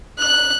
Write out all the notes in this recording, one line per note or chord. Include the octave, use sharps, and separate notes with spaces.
F#6